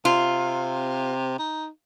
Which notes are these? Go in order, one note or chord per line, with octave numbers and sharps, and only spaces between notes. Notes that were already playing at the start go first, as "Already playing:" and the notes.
C3 F4
D#4